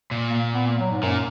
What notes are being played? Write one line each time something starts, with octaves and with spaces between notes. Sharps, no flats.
A#2
A#3
B3
A#3
F#3
G#2
F#2 A#2